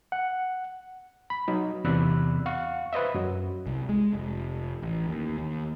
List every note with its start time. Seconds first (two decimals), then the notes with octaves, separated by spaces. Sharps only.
0.12 F#5
1.30 B5
1.48 F#3 D#4
1.85 E2 C3 D5 B5 E6 F#6
2.46 F5 F#5 C#6
2.93 B4 C5 D#5 E5
3.14 F#2 F#3
3.67 C2
3.89 G#3
4.13 F1
4.82 A1
5.08 D#2
5.38 D#2